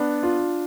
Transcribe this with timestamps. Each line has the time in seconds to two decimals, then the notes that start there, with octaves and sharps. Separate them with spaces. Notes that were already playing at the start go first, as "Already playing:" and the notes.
Already playing: B3 D4
0.23 F4